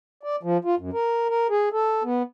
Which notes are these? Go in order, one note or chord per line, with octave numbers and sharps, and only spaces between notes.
D5
F3
F4
F#2
A#4
A#4
G#4
A4
B3